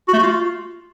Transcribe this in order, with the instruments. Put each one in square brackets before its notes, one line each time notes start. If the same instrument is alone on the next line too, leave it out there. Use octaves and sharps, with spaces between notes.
[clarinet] F#4
A3
F#4
F4